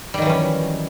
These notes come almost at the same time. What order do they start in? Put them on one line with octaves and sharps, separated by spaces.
G3 D#3 F#3 E3 C#4